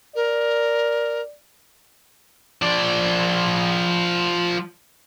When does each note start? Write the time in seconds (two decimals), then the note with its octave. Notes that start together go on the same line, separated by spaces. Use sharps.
0.15 A#4 D5
2.62 F3 D5